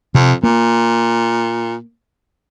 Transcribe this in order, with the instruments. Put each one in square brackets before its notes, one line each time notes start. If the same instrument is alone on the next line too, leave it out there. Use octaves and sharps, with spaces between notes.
[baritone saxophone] F2 [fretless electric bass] C3
[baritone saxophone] A#2 [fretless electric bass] A#3